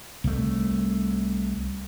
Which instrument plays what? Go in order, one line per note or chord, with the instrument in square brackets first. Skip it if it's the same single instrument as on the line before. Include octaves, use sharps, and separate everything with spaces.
[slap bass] C2 A3